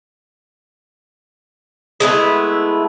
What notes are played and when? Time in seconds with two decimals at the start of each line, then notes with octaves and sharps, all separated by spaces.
2.00 G#3 A3 B3 E4